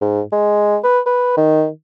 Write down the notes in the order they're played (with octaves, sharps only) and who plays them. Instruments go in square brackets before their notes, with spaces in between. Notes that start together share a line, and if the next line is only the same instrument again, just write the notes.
[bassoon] G#2
G#3
B4
B4
D#3